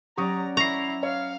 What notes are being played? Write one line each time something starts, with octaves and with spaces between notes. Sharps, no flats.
F#3 C#4 G4 D5 A#5 C#6 D#6
E4 A#5 C#6 C7
C#5 F5